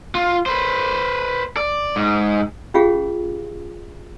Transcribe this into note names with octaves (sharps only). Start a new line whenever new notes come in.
F4
B4 C5
D5
G#2
C#4 F4 G4 G#4 F5